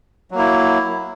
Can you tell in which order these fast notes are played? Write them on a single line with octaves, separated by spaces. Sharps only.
F#3 A#3 E4